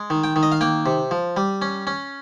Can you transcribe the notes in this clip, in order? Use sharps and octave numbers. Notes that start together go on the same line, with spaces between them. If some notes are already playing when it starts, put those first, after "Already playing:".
Already playing: G#3
D#3
G5
D#3
D#5
F5
A#3 G5
C3
F3
G3
C#4
C#4